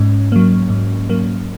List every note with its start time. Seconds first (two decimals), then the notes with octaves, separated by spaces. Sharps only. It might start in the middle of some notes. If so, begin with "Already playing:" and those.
Already playing: G#2 C#4
0.32 F#3 A#3
0.70 G#2
1.09 F#3 A#3